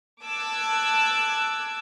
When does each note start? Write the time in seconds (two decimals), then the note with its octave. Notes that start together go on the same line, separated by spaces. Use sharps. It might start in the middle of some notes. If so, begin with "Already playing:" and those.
0.23 A5 D6 E6 F#6 G#6